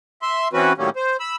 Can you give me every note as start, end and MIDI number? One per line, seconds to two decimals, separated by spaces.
0.22 0.48 76
0.22 0.48 84
0.53 0.73 52
0.53 0.73 60
0.53 0.73 61
0.53 0.73 66
0.53 0.73 71
0.78 0.90 45
0.78 0.90 51
0.78 0.90 54
0.78 0.90 55
0.78 0.90 58
0.78 0.90 61
0.96 1.17 72
1.20 1.36 83
1.20 1.36 88